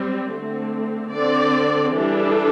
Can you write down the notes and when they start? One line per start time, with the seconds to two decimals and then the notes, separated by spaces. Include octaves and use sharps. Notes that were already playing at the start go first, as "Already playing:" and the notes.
Already playing: G3 C4
0.28 D3 A3 C4
1.10 D3 C4 D5
1.93 E3 G3 D4 A4